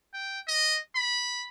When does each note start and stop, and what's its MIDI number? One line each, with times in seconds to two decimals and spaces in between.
0.13 0.40 79
0.47 0.78 75
0.95 1.48 83